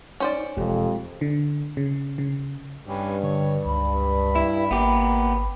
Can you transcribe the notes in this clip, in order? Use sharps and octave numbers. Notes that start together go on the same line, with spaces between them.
C#4 D#4 C5 D5
E1 F2 G#3 G4
D3
C#3
C#3
G2 C#4 G4 B4
D3 C#5
C#2 B5
E4
G#1 A#3 B3 G4